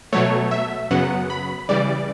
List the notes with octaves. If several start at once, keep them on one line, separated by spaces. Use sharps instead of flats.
B2 F#3 A3 C#5
E5
F#2 C#3 F#3 B3 F#5
B5
C#3 E3 G3 D5